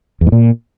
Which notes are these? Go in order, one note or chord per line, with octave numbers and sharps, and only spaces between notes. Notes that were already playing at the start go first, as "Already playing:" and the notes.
E2
G#2
A#2